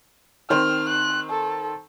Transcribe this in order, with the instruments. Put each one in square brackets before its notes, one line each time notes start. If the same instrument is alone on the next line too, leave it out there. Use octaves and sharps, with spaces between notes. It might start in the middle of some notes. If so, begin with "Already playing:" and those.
[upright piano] D#3 C4 C5 [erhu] F6
[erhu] F#6
A4